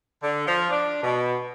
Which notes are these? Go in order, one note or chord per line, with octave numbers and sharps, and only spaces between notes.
D3
F3
D4
B2